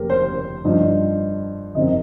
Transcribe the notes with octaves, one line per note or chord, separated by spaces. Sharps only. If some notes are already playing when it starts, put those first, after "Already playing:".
Already playing: F1 D#2 G4 A#4
C5
G2 F3 D#4
G1 F2 C3 D#3 C4 D#5